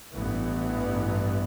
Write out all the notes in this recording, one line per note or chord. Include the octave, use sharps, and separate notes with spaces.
A1 G2 E3 B3